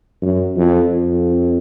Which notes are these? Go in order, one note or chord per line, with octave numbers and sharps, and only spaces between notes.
F#2
F2
F2